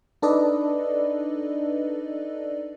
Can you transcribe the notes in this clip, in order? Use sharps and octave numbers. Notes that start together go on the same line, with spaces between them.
D4 D#4 A4 B4 D5 D#5